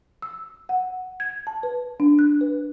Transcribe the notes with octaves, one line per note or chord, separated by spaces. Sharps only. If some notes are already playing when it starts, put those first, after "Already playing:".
E6
F#5
G#6
A5
B4
D4
F#6
B4